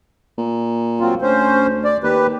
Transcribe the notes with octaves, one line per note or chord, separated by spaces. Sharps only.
A#2
F#3 C4 F4
D2 C#4 C5
D5
D#2 G4 B4